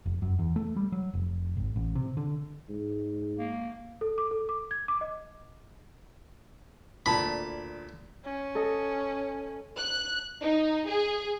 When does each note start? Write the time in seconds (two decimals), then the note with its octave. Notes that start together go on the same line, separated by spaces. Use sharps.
0.06 F1
0.22 F#2
0.39 E2
0.56 A3
0.76 G3
0.92 F#3
1.13 F1
1.57 G#1
1.76 A1
1.95 C3
2.17 D3
2.69 G#2
3.39 A#3
4.01 A4
4.18 D6
4.31 A4
4.49 D6
4.71 G#6
4.88 D6
5.01 D#5
7.06 D2 A#2 A5 B5
8.24 C#4
8.55 A4 D#5
9.78 F#6
10.42 D#4
10.88 G#4